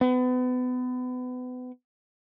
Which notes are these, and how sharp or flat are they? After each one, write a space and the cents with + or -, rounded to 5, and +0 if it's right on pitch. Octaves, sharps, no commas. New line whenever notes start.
B3 +30